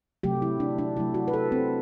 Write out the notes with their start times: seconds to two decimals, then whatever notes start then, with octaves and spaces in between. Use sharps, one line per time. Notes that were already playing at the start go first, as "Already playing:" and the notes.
0.23 C3 F#3 A3 G4
0.42 E4
0.60 D4
0.78 D4
0.97 C3 F#3 A3 E4
1.14 F#4
1.28 B4
1.33 A4
1.52 C4